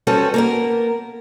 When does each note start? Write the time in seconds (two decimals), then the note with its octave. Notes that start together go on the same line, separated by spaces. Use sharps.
0.07 G3 C4 C#4 F#4 A4 B4
0.34 A#3 B3 A#4